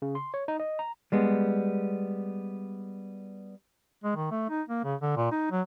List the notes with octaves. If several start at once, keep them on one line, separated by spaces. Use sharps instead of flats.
C#3
C6
C#5
D#4
D#5
A#5
G3 G#3 B3
G#3
D#3
A3
D#4
A#3
C#3
D3
A#2
D#4
F#3